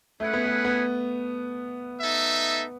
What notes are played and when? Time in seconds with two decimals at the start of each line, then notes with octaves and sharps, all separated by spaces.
0.20 A3 C#4 E4 G#4 B4 F#5
0.34 B3
0.46 A3
0.65 B3
2.01 D#4 A4 E5